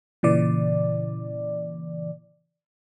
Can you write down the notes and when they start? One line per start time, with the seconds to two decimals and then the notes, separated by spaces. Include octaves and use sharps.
0.23 A#2 C#3 E3 D5